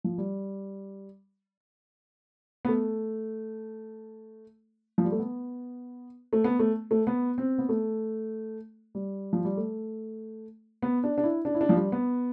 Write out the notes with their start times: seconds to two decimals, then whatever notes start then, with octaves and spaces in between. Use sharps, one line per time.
0.04 F3
0.18 G3
2.65 B3
2.68 A3
4.98 F3
5.05 G3
5.12 A3
5.19 B3
6.33 A3
6.44 B3
6.59 A3
6.91 A3
7.07 B3
7.38 C4
7.58 B3
7.69 A3
8.95 G3
9.33 F3
9.45 G3
9.57 A3
10.82 B3
11.04 D4
11.18 D4
11.24 E4
11.45 D4
11.55 E4
11.61 D4
11.69 F3
11.76 G3
11.92 B3